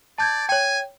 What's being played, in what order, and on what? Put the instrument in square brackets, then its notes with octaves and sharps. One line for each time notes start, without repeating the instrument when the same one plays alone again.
[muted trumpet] D5 [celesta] A5 G6 G#6
[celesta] C#5 G5 [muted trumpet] G#5